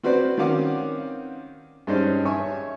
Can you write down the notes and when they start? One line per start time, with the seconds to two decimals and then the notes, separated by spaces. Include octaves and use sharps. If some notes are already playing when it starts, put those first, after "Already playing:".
0.03 C4 F#4 B4 C5 D5
0.37 D#3 C4 C#4 F5 F#5 D6
1.87 G2 G#3 C#4 D#4 C5 D5
2.25 C#5 E5 G#5 C#6